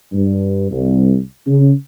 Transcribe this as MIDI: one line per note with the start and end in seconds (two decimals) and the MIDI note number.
0.12 0.69 43
0.70 1.18 36
1.45 1.71 49